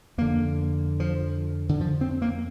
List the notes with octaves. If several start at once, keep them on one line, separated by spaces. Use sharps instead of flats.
F2 D3 A#3
F3
D3
F3
C4
A#3